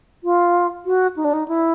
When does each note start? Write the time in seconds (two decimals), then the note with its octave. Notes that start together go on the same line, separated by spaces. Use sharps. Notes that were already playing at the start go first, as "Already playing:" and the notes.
0.24 F4
0.86 F#4
1.17 D#4
1.25 D4
1.33 D#4
1.48 E4